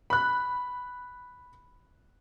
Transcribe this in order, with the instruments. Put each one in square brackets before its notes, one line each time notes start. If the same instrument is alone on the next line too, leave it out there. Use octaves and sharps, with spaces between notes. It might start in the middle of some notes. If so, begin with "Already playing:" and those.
[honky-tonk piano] B5 F#6